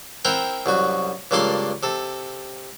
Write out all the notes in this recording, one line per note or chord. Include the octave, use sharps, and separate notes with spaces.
C4 E4 A#4 F#5 G5 A#5
C2 F#2 F#4
C#2 G2 A#3 A4 D5 C6
C3 A4